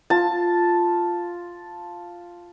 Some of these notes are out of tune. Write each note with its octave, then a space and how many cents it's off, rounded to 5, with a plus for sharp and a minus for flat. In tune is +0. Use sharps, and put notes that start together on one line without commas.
F4 +0 A5 +0